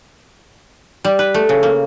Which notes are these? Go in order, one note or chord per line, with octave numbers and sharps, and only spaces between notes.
G3
B4
A3
C#3
A#3